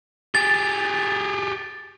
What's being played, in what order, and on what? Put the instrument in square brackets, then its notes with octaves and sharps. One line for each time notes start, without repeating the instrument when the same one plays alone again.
[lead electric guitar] G4 G#4 [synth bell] A6